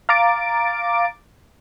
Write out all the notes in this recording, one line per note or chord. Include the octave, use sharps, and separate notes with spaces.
F5 A#5 D6 A6 D7